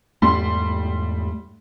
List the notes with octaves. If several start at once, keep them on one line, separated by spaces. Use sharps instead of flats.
E2 G#2 G3 A3 C6